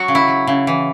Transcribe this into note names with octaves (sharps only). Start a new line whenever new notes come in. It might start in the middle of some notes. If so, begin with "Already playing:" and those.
Already playing: F#3 F#4
C#3
E4
F#3
C#3
E3